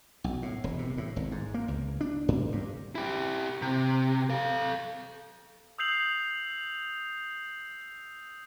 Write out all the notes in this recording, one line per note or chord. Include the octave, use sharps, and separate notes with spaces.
B1
A2
E1
C3
A2
G#1
G#2
A#3
C#2
D4
G#2
G2
E4 G4
C3
A4 F5
D#6 E6 G6 C7 F7 F#7